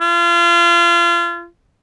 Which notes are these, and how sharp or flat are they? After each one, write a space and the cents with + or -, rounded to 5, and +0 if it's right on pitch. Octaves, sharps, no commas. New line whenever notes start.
F4 -30